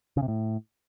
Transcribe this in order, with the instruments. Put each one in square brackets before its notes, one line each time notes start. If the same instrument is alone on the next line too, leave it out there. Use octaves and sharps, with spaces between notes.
[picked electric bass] C#3
C3
A2